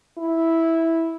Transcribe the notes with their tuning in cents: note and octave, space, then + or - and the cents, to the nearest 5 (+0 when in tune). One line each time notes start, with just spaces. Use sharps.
E4 -5